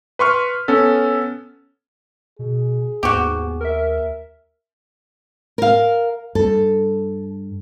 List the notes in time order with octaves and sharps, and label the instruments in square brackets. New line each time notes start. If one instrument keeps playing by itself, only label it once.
[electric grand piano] B4 C6 C#6 F6
B3 C#4 A4
[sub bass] B2 [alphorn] G#4
[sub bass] D#2 [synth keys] G#2 B3 [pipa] F#4 G4
[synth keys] A#4 E5
[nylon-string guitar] A#4 F5
[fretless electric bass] G2 [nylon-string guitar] A4